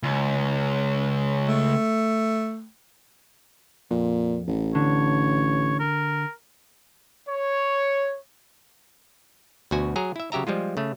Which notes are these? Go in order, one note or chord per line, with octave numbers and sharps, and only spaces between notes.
C#2
A3
F2 A#2
A1
D3 C#5
A#4
C#5
D2 B2 F#4 G#5
F#3 G#4 A#5
E4 E5
C#3 F#3 G4 E5 A#5
F3 G3 G#3 F4
C#3 A3